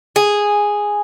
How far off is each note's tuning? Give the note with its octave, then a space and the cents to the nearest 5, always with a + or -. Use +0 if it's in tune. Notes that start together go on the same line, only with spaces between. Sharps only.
G#4 -5